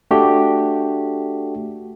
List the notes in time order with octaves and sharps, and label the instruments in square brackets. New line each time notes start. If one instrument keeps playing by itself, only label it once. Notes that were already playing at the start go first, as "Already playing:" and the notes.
[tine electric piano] A3 D4 F#4 G4